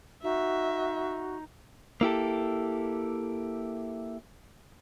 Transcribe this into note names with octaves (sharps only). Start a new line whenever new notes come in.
D#4 F#4 E5
A#3 E4 G4 A4